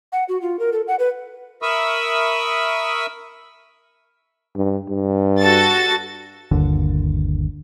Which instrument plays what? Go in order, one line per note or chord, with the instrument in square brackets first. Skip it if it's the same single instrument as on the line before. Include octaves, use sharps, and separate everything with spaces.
[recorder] F#5
F#4
F4
A#4
A4
F#5
B4
[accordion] A#4 E5 B5 C#6 D#6 E6
[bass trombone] G2
G2
[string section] F#4 A4 A6
[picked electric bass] G1 D#2 D3